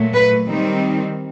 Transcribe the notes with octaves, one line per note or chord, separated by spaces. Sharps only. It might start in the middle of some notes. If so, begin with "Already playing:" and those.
Already playing: A#2 F#3 A3
B4
D#3 G3 C4 D#4